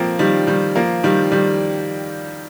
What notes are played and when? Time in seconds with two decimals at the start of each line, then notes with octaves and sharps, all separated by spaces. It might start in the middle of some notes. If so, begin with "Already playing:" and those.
Already playing: F3 A#3 C4
0.19 D#3 G3
0.47 D#3 G3
0.75 F3 A#3
1.04 D#3 G3
1.32 D#3 G3